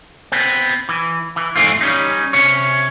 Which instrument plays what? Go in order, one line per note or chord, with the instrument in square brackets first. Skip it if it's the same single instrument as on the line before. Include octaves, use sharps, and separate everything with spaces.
[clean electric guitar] B3 C4
E3
E3
F2 G#2 E3 A3 C4 F4
G3 C#4 D#4
C3 C#4 C#5